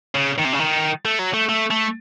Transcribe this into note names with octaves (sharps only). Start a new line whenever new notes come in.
C#3
D#3
C3
C#3
D#3
A3
F#3
A3
A3
A3